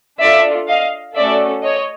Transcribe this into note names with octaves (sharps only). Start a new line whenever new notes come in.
D4 F4 A4 D5 E5
D#5 F5
A3 C#4 F#4 A4 D5 E5
C#5 D#5